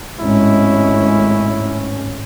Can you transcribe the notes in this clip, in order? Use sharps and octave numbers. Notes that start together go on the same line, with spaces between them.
G#1 A2 G#3 C#4 E4